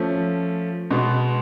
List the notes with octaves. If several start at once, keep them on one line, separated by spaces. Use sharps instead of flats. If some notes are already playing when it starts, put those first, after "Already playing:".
Already playing: F3 A3 C#4
B2 G#3 B3